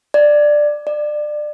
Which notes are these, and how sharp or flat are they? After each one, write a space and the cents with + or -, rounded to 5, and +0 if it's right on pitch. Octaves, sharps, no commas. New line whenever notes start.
D5 +10
D5 +25